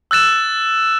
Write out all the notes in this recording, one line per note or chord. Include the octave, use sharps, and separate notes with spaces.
E6 F#6 A6 E7